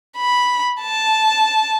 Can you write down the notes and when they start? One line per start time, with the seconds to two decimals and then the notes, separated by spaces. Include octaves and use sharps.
0.17 B5
0.82 A5